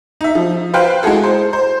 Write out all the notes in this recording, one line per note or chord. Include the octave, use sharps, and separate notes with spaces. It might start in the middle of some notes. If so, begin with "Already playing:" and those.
D#4 E5
F3
F4 B4 C5 F5 G5
G#3 E4 F#4 G#4 A4
C5
C5